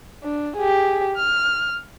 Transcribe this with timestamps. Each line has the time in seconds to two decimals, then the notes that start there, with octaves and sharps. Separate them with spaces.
0.23 D4
0.56 G4 G#4
1.16 F6